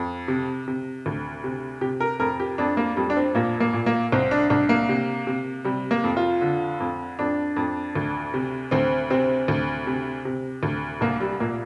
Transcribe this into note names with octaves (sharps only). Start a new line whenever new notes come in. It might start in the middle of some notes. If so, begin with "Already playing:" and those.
Already playing: F2
C3
C3
D2
C3
C3 G4
A#4
F2 A#4
G4
F2 D4
A#3
F2 G3
D4
C4
A#2 A#3
A#3
A#2
A#3
C2 C4
D4
C2 D4
A#3
C3
C3
C3 G3
A#3
F2
F4
D3
F2
F2 D4
F2
D2
C3
D2 C4
C3 C4
D2
C3
C3
D2
C2 A#3
G3
A#2 A#3